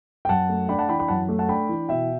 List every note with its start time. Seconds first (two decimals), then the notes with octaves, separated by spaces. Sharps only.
0.25 G5
0.29 F#2 F#5 A5
0.49 A3
0.69 D4 G5 B5
0.79 F#5 A5
0.89 E3 G5 B5
0.99 G5 B5
1.08 F#2 F#5 A5
1.29 A3
1.39 F#5 A5
1.49 D4 G5 B5
1.69 E3
1.89 B2 E5 G5